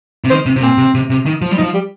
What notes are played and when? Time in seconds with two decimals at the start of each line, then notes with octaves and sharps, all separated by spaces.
0.24 C3
0.30 D#3 C5
0.46 C3
0.56 C3
0.62 A#2 C4
0.78 C3
0.94 C3
1.10 C3
1.26 D#3
1.42 F3
1.51 G3
1.58 F3 D#4
1.74 G3